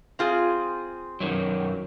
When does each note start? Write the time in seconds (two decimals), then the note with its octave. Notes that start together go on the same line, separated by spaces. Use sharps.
0.19 C4 F4 G#4
1.20 F#2 D#3 F#3